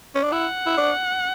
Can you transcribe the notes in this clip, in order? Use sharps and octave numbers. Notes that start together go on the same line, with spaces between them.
C#4
D4
E4 F#5
E4
D4